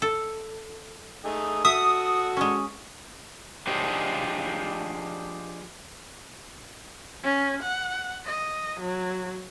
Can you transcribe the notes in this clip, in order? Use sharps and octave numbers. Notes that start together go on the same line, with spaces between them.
A4
A3 D#4 G#4
F#4 A4 E5 D#6
G#3 C#4
F3 D4 G4 G#4 C5 D#5
C#4
F#5
D#5
F#3